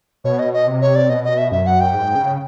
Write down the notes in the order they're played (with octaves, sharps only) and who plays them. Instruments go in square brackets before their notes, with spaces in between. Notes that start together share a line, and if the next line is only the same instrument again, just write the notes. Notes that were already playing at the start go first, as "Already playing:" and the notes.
[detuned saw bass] B2 [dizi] C#5
[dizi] D#5
D#5
[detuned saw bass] C3
[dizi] C#5
D5
[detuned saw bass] B2 [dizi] D#5
[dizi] D#5
E5
[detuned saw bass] F#2 [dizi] E5
[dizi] F#5
G5
[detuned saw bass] G#2
C#3